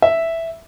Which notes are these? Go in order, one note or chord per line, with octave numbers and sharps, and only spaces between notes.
E5